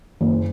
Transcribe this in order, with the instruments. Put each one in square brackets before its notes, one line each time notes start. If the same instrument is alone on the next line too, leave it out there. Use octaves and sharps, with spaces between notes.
[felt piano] F#1